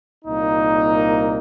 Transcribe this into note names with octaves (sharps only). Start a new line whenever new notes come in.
C2 A#2 A#3 D#4